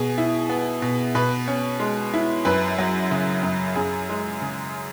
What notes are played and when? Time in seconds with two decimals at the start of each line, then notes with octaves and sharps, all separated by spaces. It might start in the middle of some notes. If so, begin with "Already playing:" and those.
Already playing: B2 G#4
0.18 E4
0.50 B3
0.82 B2
1.15 B2 B4
1.48 C#4
1.80 G#3
2.14 E4
2.45 F#2 B4
2.78 F#3
3.11 C#3
3.43 F#2
3.76 F#2 G#4
4.09 G#3
4.42 C#3